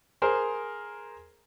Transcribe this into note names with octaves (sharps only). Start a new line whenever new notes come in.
G#4 A#4 C5